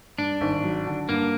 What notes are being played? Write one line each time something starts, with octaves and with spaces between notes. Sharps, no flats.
G2 D4
G#1
F#3
D3
G2 A#3